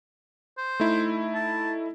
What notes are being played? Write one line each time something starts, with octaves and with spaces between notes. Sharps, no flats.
C5
A3 D#4 E4
A5